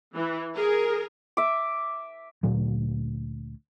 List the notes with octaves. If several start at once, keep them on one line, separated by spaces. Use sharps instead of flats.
E3
G#4 A#4
E5 D6
D2 A#2 F#3